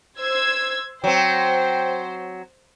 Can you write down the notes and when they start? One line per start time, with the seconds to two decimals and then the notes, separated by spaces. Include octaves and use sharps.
0.20 C5 E6 G#6
1.04 F#3 C4 C5 G5